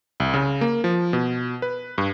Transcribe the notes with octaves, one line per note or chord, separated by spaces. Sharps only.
C2
C#3
A#3
F3
B2
B4
G2